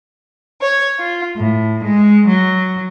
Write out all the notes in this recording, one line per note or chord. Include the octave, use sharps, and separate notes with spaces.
C#5
F4
A2
G#3
F#3